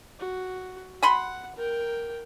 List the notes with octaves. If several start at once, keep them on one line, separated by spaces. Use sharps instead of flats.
F#4
F#5 G#5 B5 C6
A#4 G5